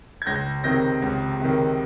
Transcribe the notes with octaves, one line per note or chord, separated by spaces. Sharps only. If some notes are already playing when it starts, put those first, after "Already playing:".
G#6
C#2 G6 A#6
C3 D#3 G6 A#6
C#2
C3 D#3